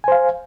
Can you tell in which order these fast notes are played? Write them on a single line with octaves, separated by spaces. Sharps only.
G#5 C5 F5